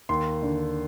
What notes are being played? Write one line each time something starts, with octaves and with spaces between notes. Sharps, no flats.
D#2 C6
D3